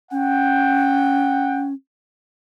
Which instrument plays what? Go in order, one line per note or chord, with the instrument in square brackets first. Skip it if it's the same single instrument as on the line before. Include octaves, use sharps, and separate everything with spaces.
[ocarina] C#4 [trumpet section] F#5 G5